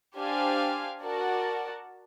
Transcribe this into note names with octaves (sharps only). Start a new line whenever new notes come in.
D4 G4 C5 F5 G#5
F#4 A#4 D5 F#5 A5